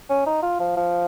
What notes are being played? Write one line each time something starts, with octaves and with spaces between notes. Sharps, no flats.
C#4
D#4
F4
F3
F3